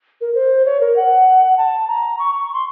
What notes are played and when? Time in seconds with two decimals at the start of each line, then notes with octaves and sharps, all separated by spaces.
0.21 A#4
0.35 C5
0.65 C#5
0.81 A#4
0.96 F#5
1.57 A5
1.88 A#5
2.19 C#6
2.35 C#6
2.53 C6